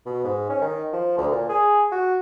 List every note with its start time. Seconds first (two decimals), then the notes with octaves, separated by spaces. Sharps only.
0.06 B2
0.24 G#2
0.49 C#4
0.62 D#3
0.93 F3
1.18 D2
1.32 A#2
1.49 G#4
1.92 F#4